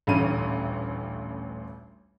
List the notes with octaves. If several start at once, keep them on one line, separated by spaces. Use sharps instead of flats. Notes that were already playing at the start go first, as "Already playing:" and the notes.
D#1 A1 D2 C#4 D#7